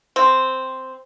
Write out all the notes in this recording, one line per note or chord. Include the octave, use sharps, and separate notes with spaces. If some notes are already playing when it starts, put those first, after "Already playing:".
C4